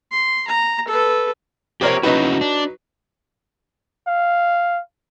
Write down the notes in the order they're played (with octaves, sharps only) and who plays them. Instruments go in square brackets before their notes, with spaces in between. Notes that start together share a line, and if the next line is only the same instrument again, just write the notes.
[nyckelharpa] C6
A#5
A4 B4
[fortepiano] A#1 A#4 C#5 [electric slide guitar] G4 C5
[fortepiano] F#3 D#4 B4 [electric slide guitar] C#4 E4 F#4
[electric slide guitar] D4
[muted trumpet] F5